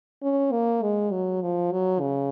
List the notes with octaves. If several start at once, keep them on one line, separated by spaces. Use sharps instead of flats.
C#4
A#3
G#3
F#3
F3
F#3
C#3